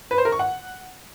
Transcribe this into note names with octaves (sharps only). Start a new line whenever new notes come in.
B4
C5
A#4
C#6
F#5